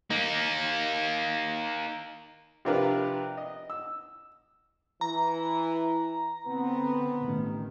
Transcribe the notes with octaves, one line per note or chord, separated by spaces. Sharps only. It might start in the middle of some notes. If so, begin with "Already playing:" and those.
A#3 D#4
C3 F3 D4 F4 A#4 B4
D#5
E6
E3 A#5
D3 B3 C4
A1 D#3